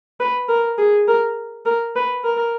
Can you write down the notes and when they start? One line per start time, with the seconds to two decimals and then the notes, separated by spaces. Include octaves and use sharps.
0.20 B4
0.49 A#4
0.78 G#4
1.08 A#4
1.66 A#4
1.96 B4
2.25 A#4